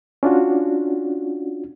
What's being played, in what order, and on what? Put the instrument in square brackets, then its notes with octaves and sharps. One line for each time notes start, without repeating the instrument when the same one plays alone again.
[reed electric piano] C#4 D4 F4 F#4